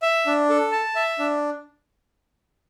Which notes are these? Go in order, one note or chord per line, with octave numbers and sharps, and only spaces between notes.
E5
D4
A4
A5
E5
D4